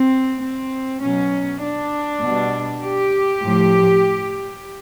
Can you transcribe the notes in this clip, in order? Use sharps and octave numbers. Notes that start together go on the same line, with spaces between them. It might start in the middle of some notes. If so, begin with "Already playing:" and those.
Already playing: C4
C4
B2 F#3 C#4
D4
B2
G3
G4
A2 F3